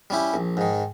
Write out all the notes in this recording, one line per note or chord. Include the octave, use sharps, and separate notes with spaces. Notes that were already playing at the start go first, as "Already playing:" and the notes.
G3 C#4 E4 G4
A#1
G#2 D#3